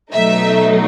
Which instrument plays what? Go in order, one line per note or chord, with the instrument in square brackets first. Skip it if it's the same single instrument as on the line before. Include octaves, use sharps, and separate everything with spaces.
[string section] B2 F#3 A3 D#4 E5